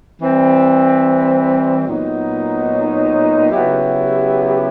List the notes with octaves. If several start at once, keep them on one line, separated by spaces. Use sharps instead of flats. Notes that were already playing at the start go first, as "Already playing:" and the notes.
E3 G3 C4
A#2 F#3 B3 D#4
C#3 F#3 B3 E4 G4